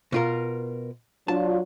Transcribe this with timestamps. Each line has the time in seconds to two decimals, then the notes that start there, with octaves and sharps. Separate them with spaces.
0.12 B2 F4 A#4
1.28 F#3 D4 F4 A5